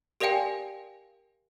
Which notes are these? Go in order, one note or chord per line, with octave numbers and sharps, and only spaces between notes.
G4 A#4 D5 F5 G5 G#5